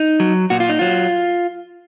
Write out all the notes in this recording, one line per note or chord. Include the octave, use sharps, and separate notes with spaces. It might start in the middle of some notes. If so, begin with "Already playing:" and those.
Already playing: D#4
F#3
A#2 F#4
F4
D#4
F#3 F4